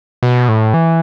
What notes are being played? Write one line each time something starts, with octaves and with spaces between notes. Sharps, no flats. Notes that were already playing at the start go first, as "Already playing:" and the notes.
B2
A2
E3